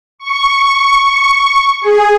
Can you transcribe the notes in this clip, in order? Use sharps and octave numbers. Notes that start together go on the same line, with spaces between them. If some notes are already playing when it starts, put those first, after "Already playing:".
C#6
G#4